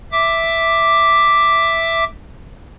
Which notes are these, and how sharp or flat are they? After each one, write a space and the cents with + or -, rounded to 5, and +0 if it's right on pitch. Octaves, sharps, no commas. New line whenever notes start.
E5 +0 D6 +0